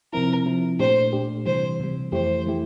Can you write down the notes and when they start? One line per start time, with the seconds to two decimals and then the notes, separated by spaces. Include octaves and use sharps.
0.13 C3 F3 C4 E4 A#4
0.46 C3 F3 C4 E4
0.79 A#2 A3 D4 G4 C5
1.13 A#2 A3 D4 G4
1.46 C3 E3 G3 C5
1.80 C3 E3 G3
2.12 F2 E3 A3 E4 G4 C5
2.46 E3 A3 E4 G4